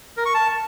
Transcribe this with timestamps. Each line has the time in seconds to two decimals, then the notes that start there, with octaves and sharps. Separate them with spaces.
0.17 A#4
0.26 C#6
0.34 A5